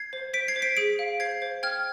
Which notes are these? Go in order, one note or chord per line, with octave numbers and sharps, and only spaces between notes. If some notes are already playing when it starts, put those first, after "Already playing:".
Already playing: G#6 C7
C5
C5 B6 D7
G#6 C7
C5
B6 D7
G#4 B6 D7
F5
C5 G#6 C7
C5
G5 F6 G#6